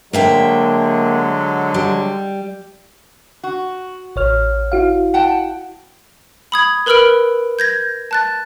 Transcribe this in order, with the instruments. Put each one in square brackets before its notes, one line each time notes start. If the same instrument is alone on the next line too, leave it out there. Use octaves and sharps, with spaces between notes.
[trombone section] D3 F#3 G#3 [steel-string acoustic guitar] A#3 E5 G5
[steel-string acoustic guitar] G3
[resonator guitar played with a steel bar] F#4
[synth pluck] A1 C#5 F6
E4 F#4 F5
[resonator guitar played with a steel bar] F#5 G5 A5
[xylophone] B5 D#6 G#6
A#4 B4 B5 E6 F6 D7
G6 G#6 A#6
A5 F#6 A6